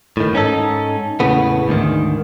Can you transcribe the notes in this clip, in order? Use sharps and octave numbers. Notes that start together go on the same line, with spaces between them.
A2 D#3
G#2 C#4 D#4 A4
E2 A2 C#3 B3
D2 G#2 D#3